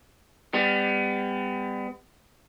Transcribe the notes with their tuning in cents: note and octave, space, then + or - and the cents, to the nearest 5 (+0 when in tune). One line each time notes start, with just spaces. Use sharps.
G3 +30 B3 +35